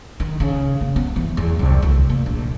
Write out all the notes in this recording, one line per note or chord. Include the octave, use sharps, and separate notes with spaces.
D#3
C#3
A#3
B3
E3
E2
C2
D2
A#3
A#1